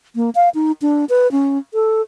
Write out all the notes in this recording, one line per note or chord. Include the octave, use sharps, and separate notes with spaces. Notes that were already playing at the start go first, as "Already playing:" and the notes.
A#3
F5
D#4
D4
B4
C#4
A4